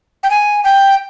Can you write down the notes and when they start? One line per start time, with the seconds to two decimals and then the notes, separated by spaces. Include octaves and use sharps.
0.23 G5
0.30 G#5
0.64 G5